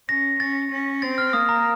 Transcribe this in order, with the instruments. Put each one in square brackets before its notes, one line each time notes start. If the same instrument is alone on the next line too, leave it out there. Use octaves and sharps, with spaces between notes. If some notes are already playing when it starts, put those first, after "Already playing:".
[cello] C#4 [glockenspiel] A#6
[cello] C#4 [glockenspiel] A6
[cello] C#4
[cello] C4 [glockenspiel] A6
[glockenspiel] F6
[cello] A#3 [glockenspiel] D#6
[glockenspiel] A#5